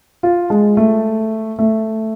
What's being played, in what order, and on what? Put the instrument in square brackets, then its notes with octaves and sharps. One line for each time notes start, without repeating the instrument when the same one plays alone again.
[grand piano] F4
G#3
A3
A3